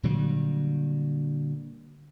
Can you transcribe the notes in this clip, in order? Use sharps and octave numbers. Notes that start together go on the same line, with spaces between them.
A#2 D3 F#3 G3